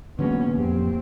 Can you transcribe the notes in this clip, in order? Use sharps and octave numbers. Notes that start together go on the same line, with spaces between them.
A1 D3 F#3 G#3 A#3 B3 C#4
F2 C4 G4